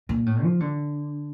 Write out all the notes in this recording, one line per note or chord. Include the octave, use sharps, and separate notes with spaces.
A#2
A2
F3
D3